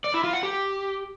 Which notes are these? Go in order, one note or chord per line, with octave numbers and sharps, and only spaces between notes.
D5
E4
F4
F#5
G4